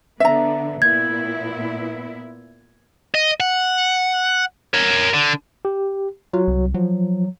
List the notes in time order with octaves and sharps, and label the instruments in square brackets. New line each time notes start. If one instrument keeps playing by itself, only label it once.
[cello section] D3 B3 [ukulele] E5 A#5
[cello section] A#2 B3 E4 [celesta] G#6
[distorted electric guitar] D#5
F#5
A#4 C#5
D3
[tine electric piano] G4
[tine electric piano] F#3 [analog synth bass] F4
[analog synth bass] C2
[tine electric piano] F3 [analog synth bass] F#3